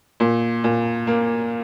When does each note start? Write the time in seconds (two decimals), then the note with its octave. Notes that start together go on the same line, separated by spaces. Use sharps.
0.20 A#2
0.64 A#2
1.07 A#3